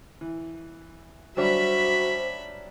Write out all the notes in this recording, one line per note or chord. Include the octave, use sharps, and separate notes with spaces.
E3
F#3 G3 D4 F#4 C5 E5 B5